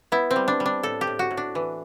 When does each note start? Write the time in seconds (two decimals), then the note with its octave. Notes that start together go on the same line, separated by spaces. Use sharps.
0.12 B3 E4
0.31 C4
0.36 G3
0.48 D4
0.60 G3
0.66 D4
0.83 A2 A4
1.01 G4
1.07 A2
1.19 F#4
1.31 A2
1.37 D4
1.55 E3